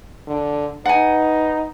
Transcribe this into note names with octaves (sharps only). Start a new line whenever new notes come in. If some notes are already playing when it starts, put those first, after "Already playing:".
D3
D#4 B4 F#5 G#5